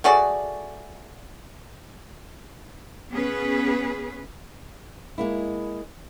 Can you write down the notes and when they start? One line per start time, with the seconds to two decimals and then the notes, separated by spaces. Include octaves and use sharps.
0.04 A3 F#4 G#4 D5
3.11 B3 C#4 G#4 B4
5.18 G#3 A#3 E4